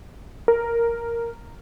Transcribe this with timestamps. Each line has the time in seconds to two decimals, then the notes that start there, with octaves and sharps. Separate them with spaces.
0.48 A#4